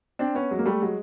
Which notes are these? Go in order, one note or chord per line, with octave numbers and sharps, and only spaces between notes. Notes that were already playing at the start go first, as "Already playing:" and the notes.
C4 D4
B3 C#4
F#3 G#3
A#3
G3 A3
F#3 G#3